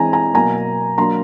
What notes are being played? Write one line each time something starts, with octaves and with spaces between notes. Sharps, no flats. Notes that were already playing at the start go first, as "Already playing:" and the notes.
Already playing: E3 G#3 C4 G#5 A#5
G#5 A#5
B2 F#3 A#3 G#5 A#5
F#3 A#3 D4 A#5 C6